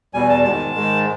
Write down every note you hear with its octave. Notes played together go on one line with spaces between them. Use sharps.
E2 B2 G3 G#5
A5
G#2 D#3 G#3 A5
G#2 D#3 G#3